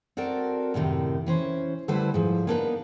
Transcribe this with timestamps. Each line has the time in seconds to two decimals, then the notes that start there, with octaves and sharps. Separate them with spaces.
0.17 C4 F#4 A4 A#4 D5
0.74 F#2 A2 C3 D#3
1.26 E3 C#4 C5
1.88 D3 G3 A3 E4 B4 C5
2.14 G#2 F3
2.47 A#3 B3 D4 D#4 G#4 B4